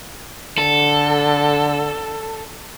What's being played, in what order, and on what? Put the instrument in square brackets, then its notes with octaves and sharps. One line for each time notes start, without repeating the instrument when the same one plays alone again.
[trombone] D3 [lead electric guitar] A4